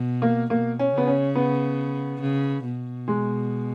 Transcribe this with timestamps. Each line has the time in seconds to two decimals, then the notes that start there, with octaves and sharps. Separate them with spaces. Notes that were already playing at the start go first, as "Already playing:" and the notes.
Already playing: B2
0.22 A#3
0.50 B2 A#3
0.79 C#4
0.93 C#3 B3
1.07 C#4
1.35 B3
2.21 C#3
2.64 B2
3.08 G#3